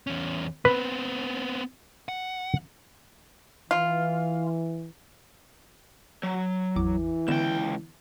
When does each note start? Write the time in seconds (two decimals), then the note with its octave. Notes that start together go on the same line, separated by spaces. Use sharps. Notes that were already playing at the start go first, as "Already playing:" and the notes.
0.07 E2 C#4
0.65 B3 C4 B4
2.09 F#5
3.71 E3 F4
6.23 F#3
6.76 G#1 E2 E3 D6
7.28 C#2 D3 B3 G5 E7